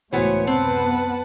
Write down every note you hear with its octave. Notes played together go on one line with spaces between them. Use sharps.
C#2 A2 E3 A3 B3 F#4 C5 C#5
F#2 C3 B3 C4 B4 F#5 A5